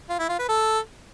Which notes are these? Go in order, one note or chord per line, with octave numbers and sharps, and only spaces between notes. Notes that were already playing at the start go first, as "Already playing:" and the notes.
F4
E4
F4
B4
A4